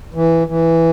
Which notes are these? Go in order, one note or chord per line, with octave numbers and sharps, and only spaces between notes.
E3
E3